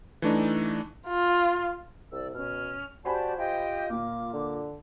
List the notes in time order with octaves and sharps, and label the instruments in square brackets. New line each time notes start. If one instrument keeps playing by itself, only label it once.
[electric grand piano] E3 A3 D4 D#4
[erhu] F4
[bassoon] C2 [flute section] D5 E6
[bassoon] B2 [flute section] C#4 F6
[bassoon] F#4 [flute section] G4 D5 A5 [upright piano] C5 G#5 B5
[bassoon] F4 [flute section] G4 D#5 G5
[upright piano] A#2 A#3 [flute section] D6
[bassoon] D3